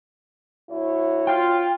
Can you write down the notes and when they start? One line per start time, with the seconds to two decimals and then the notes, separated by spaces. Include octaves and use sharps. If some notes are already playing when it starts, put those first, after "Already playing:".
0.71 D2 E4 F#4 C#5
1.27 F4 G5